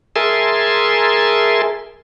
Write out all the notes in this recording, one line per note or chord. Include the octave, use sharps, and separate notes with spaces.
G#4 A#4 E5 G#5 A5 C6